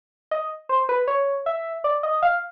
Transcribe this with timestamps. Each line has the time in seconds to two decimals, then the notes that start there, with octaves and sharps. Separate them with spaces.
0.31 D#5
0.69 C5
0.89 B4
1.08 C#5
1.46 E5
1.84 D5
2.03 D#5
2.22 F5